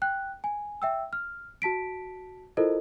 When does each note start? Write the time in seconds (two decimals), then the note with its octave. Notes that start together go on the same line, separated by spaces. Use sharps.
0.02 G5 F#6
0.44 G#5
0.82 E5 G5 E6
1.13 F6
1.62 F#4 A5 B6 D7
2.57 E4 F4 A4 A#4 C5 D#5